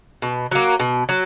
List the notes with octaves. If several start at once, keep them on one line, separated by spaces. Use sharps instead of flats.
B2
F#3 A#3
B2
F#3